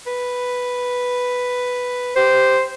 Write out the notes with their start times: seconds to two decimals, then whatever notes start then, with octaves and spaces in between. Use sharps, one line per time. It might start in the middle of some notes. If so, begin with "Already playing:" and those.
0.07 B4
2.16 G4 C5